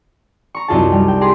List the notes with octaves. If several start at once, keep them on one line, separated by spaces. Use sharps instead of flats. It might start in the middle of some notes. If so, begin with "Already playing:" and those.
A#5 C#6
C2 F#2 D#4 F4 G#4 A5
G3
G5
G4 G#4 A#5 C6